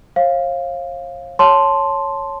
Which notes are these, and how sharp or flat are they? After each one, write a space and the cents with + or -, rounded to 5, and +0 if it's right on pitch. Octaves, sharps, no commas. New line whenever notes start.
C#5 -45 F5 +0
C#5 +0 A5 +0 C6 +0